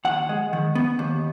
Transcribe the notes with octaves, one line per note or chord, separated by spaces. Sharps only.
D#2 F#5
G#3
D#3
B3
D#2